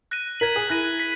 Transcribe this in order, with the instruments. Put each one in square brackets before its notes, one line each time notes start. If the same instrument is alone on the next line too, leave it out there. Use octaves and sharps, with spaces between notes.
[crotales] F#6 A#6 D#7
[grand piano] A#4 [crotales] G#6 B6 F#7
[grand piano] G#4
[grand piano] E4 [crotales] F#6 A#6 D#7
[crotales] B6